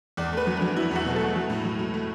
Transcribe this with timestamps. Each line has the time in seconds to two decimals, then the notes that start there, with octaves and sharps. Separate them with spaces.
0.17 E2 D5
0.33 A3 B4
0.47 F#3
0.57 D4
0.62 F#3
0.77 F#3 E4
0.91 E2 F#4
1.06 B2
1.16 A4
1.20 A3
1.36 F#3
1.50 A2
1.65 F#3
1.79 F#3
1.94 A3